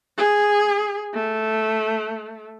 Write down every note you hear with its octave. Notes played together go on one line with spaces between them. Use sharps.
G#4
A3